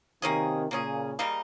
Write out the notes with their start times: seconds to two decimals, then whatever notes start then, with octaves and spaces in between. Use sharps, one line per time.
0.22 C3 D#3 A#3 C#4 G#4
0.71 A#2 C#3 A#3 C#4 G#4
1.19 C#3 G3 A#3 D#4